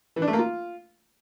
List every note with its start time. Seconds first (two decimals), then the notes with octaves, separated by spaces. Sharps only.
0.16 E3
0.22 D4
0.28 A3
0.33 A#3
0.39 F4